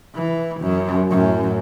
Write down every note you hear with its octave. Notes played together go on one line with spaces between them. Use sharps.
E3
F#2
F#2 A2